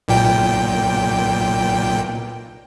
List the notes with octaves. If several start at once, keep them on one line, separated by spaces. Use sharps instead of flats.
B1 A#2 G5